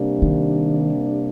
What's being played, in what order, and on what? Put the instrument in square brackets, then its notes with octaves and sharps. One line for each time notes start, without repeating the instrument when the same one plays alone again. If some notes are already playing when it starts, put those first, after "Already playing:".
Already playing: [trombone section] C3 G3 A#3 D4
[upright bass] D#3